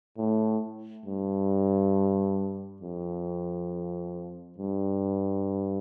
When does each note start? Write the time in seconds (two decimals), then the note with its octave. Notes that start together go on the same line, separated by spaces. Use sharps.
0.18 A2
1.06 G2
2.82 F2
4.58 G2